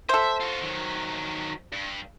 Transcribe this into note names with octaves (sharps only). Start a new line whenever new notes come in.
A4 C5 E5
F4 F#4
D#3 F#3
G2